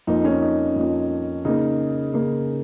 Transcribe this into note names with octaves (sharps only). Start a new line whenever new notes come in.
F2 F3 A#3 D#4
C#4
D#4
F2 F3 A#3
C#3 A#3 D#4
C#3 A#3